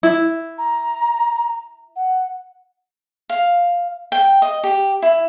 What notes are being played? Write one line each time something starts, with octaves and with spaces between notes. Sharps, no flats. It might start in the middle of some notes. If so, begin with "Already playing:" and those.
E4
A#5
F#5
F5
G5
D#5
G4
E4